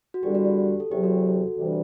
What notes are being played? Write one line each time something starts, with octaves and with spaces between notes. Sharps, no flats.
F#4
E2 D3 G3 G4
F#4
G4
A4
E2 C3 F#3 G4
F#4 A4
D2 C3 E3 G3 D4